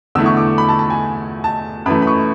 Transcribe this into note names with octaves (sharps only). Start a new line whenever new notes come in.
E2 D3 A3 E4 E6
C#6
D6
B5
A5
A5
G#5
A5
F#2 E3 A3 B5
B5
C#6